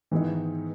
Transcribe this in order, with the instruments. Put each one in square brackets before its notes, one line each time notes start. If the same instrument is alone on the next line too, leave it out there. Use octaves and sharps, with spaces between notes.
[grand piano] G#2 D#3 G#3 B3 D#4 [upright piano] E3